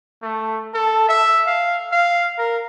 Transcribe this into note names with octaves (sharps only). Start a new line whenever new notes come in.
A3
A4
E5
F5
F5
A#4